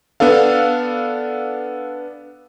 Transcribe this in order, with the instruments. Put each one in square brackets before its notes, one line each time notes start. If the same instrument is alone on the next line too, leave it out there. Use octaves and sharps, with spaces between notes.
[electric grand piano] B3 D4 A4 F5